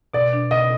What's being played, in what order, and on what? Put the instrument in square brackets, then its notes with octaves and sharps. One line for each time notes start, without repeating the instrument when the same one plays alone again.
[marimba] B2 [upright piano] D5
[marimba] D4
[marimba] B2 [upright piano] D#5